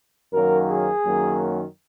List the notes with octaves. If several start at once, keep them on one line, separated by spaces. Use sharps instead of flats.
F#2 D#3 F#3 A#3 A#4
G#4
F#2 D#3 F#3 A#3